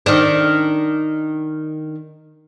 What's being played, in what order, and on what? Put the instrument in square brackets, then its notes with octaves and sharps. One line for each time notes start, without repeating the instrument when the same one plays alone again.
[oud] D#3 D4